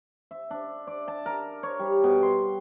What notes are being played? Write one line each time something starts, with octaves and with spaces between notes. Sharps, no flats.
E5
D4
D5
A5
A#4
C#5
G3
B2
C6